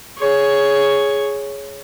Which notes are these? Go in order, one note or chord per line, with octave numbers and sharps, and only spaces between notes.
G#4 C#5